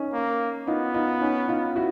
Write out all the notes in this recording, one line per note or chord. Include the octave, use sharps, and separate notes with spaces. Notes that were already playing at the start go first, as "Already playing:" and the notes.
Already playing: C#4 D#4
A#3
B3 D#4 F4
D#4 F4
C#4 D#4
D#4 F4
E4 F#4